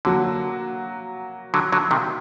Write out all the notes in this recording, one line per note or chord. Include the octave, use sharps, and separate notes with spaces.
D3 F#3 A#3 F#4
D3 F#3
D3 F#3
C3 D#3